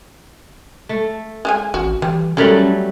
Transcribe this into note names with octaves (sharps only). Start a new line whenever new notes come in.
A3
G#3 A4 G#5
A1 F#4
E3 G3
F#3 G3 A3 C#4 A4 A#4